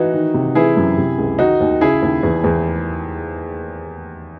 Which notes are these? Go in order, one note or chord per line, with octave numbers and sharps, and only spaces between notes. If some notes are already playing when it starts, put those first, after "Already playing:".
Already playing: E3 D#4 F#4
D#3
C3
E3 E4 G#4
F#2
C3
C#2
D#3 D#4 F#4
D#2
C#3 E4 G#4
D#2
E2
E2